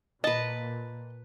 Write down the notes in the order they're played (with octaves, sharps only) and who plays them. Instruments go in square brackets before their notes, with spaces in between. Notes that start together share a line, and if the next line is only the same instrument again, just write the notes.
[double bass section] A#2 [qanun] B4 A5 [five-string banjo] D#5